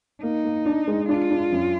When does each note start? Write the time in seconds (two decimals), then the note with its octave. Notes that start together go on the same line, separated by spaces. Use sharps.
0.22 A#3 D#4
0.45 A#3
0.66 D4
0.87 G#3
1.09 D4 F4
1.30 D4
1.52 F#2